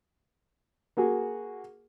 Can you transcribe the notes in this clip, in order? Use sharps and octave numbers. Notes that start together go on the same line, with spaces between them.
A#3 F#4 G#4